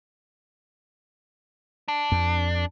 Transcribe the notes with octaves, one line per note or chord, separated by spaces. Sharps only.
D4
F2